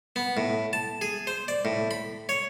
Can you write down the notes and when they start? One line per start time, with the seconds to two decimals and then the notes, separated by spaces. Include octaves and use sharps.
0.16 B3
0.37 A2
0.73 A5
1.01 G#4
1.27 C5
1.48 D5
1.65 A2
1.91 B5
2.29 C#5